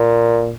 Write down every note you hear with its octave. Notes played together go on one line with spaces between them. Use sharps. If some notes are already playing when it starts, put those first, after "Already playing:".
Already playing: A#2